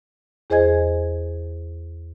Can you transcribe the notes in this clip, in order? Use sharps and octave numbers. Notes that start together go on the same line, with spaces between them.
E2 G#4 C5 D#5 G#5 G#6